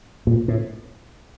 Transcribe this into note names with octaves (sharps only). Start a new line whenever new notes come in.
A#2
A2